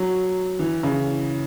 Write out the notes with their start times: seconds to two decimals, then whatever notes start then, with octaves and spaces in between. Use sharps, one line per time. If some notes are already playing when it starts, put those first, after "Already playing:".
Already playing: F#3
0.59 E3
0.83 C#3